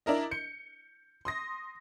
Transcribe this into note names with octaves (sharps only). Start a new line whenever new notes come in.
D4 E4 A#4 D#5
G6 C#7
C6 D#6 A#6